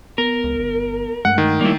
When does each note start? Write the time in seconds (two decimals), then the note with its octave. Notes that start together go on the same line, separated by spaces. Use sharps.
0.18 B3 A#4
0.44 C#2
0.59 G1
1.25 G2 G#3 A3 F#5
1.38 D#3
1.61 G3 A#3 E4